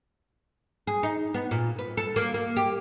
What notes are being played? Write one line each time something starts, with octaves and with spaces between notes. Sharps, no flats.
G#4
D#4
B3
A#2
B4
A4
A#3
A#3
G4